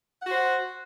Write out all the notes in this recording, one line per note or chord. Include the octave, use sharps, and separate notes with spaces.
F#4 C5 F#5